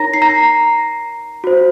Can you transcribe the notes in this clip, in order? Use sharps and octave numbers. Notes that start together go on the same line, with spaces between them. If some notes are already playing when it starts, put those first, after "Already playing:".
Already playing: D#4 A#4 C#5 A#5 A#6
C7
A#5 A#6
F#4 C5